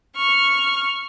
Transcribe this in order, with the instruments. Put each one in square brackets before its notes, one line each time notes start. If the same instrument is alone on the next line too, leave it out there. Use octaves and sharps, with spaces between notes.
[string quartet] C#6 F6